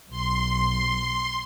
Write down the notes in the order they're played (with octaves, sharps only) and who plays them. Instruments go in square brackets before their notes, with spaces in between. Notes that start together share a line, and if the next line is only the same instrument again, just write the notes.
[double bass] B1 [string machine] C6